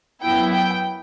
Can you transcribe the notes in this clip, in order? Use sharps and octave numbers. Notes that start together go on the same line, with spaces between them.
F#2 F#3 B3 E4 G5
G5